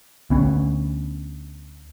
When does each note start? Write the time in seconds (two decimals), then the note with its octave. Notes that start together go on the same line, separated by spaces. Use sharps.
0.30 D2 B3 C#4